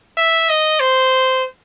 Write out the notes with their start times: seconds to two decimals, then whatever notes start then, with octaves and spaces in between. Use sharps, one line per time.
0.17 E5
0.49 D#5
0.80 C5